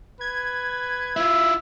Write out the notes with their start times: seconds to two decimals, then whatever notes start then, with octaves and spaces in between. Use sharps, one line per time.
0.21 B4 G#6
1.17 E4 F4 E5